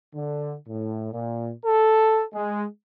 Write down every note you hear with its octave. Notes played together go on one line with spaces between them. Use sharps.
D3
A2
A#2
A4
G#3